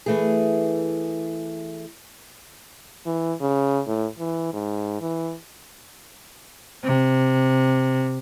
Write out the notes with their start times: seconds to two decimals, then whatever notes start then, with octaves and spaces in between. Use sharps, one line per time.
0.06 E3 A3 G#4
3.06 E3
3.41 C#3
3.87 A2
4.19 E3
4.53 G#2
5.01 E3
6.84 C3